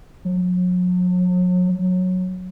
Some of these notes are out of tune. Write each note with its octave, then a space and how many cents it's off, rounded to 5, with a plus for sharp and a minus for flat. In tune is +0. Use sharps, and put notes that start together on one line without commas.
F#3 -40
F#3 -15